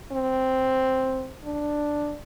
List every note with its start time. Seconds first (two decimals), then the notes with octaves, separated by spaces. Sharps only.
0.12 C4
1.45 D4